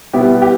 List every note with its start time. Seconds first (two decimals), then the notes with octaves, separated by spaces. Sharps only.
0.13 B2 G3 B3 E4 G4
0.42 G4